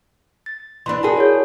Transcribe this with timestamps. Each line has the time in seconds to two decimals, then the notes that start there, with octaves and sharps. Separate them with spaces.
0.46 A6
0.86 E3 D4 B5 C6
1.03 F#4 G#4 A#4 A5
1.17 C#5 G6